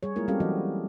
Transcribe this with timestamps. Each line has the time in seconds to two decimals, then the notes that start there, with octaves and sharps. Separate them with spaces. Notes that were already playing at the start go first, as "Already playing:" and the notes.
0.03 G3 G#4 C#5
0.16 G#3 A#3 E4 F4 A#4
0.28 G3 C4 C#4 G4 A4 F5
0.40 E3 F#3 F#4 D#5